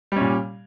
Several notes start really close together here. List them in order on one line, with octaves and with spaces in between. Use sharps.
G3 C#4 A#2